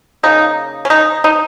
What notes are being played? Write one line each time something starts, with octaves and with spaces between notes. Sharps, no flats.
C#3 A#3 D#4
C#4
D#4
D#4